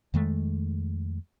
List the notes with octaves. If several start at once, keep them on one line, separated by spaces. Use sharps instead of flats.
F2 D#3 G#3 A3